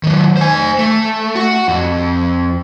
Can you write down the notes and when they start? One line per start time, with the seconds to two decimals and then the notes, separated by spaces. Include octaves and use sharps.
0.03 D#3 F#3
0.37 C5 G#5
0.79 A3
1.35 F#4
1.68 F2